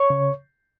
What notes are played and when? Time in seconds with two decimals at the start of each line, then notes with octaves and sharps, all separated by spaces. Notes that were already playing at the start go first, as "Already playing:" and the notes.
Already playing: C#5 C#6
0.10 C#3